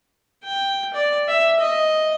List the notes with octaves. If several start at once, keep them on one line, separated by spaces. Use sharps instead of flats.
G5
D5
E5
D#5